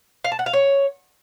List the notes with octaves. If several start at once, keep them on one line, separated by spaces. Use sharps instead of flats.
F5
A5
F#5
F5
C#5